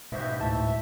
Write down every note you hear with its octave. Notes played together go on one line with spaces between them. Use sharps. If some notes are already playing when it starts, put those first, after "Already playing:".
G#2 B2 B4 C5 E5
D2 A2 E5 A5